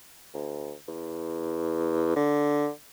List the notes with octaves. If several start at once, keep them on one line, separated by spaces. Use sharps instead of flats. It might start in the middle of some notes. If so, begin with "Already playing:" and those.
D2
E2
D3